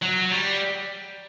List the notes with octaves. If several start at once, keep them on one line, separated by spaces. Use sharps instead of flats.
F#3
G3